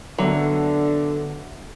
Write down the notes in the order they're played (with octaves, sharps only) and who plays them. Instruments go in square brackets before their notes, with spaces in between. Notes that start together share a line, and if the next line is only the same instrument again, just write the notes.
[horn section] D3 [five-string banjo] F#3 [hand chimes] B3 E5 F#5